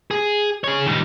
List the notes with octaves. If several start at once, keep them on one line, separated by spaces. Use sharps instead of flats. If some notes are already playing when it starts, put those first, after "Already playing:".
G#4
G#4 C#5
D#3 G3